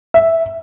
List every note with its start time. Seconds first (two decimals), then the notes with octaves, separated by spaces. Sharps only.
0.14 E5